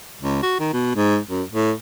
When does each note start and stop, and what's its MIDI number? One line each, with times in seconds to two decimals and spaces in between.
0.22 0.39 37
0.43 0.57 66
0.60 0.70 51
0.73 0.93 47
0.95 1.18 44
1.30 1.43 42
1.51 1.72 45